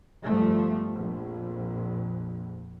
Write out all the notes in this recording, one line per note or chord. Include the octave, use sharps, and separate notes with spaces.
G1 F3 G3 A3
A#1 F2